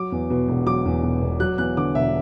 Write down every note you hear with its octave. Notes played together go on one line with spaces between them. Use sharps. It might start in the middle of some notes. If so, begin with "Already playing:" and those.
Already playing: F#3 D6
E2
B2
E1
F#3 D6
E2
B2
E1
F#3 F#6
E2 F#6
D3 D6
E1 E5